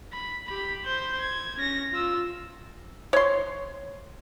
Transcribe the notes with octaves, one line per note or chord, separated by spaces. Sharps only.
B5
G4 B5
C5 G6
G#6
C#4 A#6
F4 E6
C#5 C6